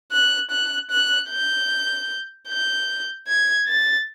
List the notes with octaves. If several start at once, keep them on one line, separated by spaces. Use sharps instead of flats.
F#6
F#6
F#6
G6
G6
G#6
A6